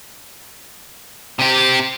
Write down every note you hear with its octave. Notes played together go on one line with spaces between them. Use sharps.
C3 G4